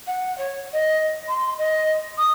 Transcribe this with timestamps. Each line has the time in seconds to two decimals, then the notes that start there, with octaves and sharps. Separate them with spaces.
0.07 F#5
0.38 C#5
0.73 D#5
1.28 C6
1.58 D#5
2.18 D#6